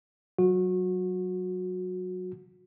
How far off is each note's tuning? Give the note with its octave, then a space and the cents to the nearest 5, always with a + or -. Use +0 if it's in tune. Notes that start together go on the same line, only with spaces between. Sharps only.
F#3 +5 F#4 -25